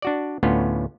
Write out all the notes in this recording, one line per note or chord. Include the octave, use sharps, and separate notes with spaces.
D4 F#4 D5
D2 A2 B3 C#4 F4